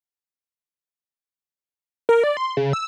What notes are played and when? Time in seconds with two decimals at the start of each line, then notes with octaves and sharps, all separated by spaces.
2.09 A#4
2.23 D5
2.37 C6
2.57 C#3
2.73 E6